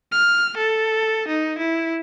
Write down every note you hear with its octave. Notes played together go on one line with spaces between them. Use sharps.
F6
A4
D#4
E4